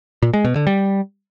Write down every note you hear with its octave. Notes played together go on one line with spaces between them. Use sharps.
A#2
G#3
B2
D3
G3